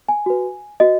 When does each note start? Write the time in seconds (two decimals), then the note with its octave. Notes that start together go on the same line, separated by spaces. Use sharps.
0.09 G#5
0.26 F#4 B4
0.80 F#4 B4 D#5